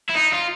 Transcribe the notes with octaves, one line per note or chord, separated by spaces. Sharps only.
E4
D#4
F4